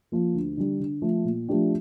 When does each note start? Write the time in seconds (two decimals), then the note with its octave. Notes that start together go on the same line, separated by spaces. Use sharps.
0.12 F3 A#3
0.35 D2
0.57 D3 G3
0.80 D3
1.02 F3 A3
1.25 A#2
1.49 F3 A3 D4 G4